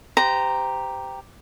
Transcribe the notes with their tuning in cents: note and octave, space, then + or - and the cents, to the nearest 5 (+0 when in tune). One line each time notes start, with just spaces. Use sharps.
G4 +0 C5 -30 A#5 +0